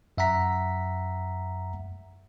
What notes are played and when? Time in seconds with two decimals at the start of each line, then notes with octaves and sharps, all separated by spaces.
0.18 F#2 E5 F#5 A#5 B6